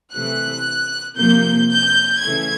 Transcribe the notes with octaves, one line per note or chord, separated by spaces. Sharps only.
C3 E3 A3 F#6
C3 F3 A#3 G6
G6
C#3 E3 A3 G#6